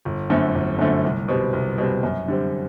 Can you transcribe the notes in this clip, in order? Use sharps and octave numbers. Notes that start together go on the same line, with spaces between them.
G1
F#2 D3 A3 C4
G1
F#2 D3 A3 C4
C2
B2 G3 C4
C2
B2 G3 C4
F#2
D3 G3 C4